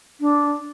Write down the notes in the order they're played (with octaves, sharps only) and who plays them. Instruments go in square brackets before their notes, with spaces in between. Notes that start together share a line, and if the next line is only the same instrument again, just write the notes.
[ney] D4